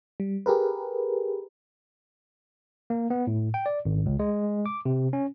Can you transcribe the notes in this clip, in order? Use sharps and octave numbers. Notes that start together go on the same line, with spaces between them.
G3
G4 G#4 A#4 B4
A#3
B3
A2
G5
D5
G#1
C#2
G#3
D6
C3
C#4